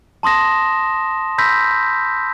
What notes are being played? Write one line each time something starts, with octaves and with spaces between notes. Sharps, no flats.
A5 C6 D#6 A#6 E7
B5 C6 E6 G6 A#6 B6